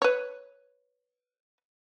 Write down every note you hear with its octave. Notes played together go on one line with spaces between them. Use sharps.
B4 C#5